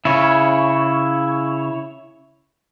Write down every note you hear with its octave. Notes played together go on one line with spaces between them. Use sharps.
C#3 E4 C#5